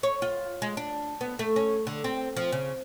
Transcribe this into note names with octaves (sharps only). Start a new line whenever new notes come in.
C#5
F4
G#3
D4
B3
A3
C#4
D3
C4
F3
C#3